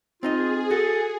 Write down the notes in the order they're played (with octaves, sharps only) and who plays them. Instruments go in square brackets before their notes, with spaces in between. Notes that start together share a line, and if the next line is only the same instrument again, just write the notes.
[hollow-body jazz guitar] C4 D#4 D#5 [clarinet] F4 [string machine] G#4
[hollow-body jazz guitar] F#4 [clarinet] A4